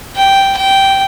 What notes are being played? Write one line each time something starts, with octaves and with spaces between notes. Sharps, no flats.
G5
G5